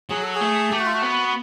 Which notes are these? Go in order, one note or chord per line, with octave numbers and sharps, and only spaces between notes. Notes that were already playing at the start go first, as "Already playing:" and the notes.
F#3 G#4
A4
G#4
A3
A3 G4
F#4
F4
F#4
B3